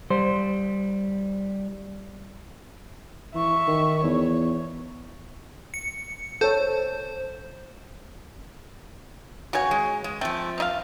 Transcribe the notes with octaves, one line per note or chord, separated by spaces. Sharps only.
G3 C5
E3 E5 C#6
D#3
E2 C#5
C#7
A4 C5 C#5
C#3 F#4 C#5 G#5
G#3
G#3
F3 A3 C4 G5
C3 D#4 F5